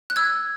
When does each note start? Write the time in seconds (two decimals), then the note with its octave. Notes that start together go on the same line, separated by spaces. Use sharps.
0.10 F#6
0.16 E6 G#6